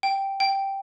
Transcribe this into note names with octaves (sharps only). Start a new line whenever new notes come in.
G5
G5